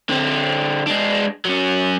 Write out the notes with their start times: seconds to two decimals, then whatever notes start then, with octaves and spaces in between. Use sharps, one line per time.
0.09 D3 C4
0.86 G#3 D4
1.45 F#3 C#4